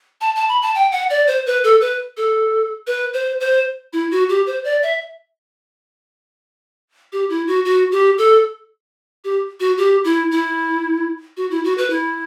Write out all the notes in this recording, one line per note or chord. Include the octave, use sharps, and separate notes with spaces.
A5
A5
B5
A5
G5
F#5
D5
C5
B4
A4
B4
A4
B4
C5
C5
E4
F#4
G4
C5
D5
E5
G4
E4
F#4
F#4
G4
A4
G4
F#4
G4
E4
E4
F#4
E4
F#4
B4
E4